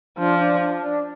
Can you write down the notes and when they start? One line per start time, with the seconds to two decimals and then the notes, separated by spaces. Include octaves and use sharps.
0.18 F3 D4
0.40 D4
0.61 D4
0.82 D4